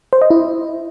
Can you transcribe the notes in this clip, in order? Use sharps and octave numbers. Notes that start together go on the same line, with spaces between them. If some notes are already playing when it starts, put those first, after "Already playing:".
C5
D#5
E4